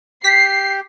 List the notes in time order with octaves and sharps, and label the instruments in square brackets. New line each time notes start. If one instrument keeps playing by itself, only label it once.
[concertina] G4 [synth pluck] B6 [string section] C7